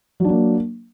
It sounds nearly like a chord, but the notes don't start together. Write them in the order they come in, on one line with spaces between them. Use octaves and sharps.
F#3 D4 A#3